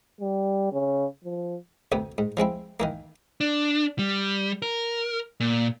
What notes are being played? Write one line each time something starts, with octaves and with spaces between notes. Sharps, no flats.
G3
C#3
F3
D2 C3 B3
G#2
F3 G#3 C4 E4
D#3 E3 A#3
D4
G3
A#4
A#2